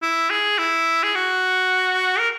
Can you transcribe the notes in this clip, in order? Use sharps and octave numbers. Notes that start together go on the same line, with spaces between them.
E4
G#4
E4
G#4
F#4
A#4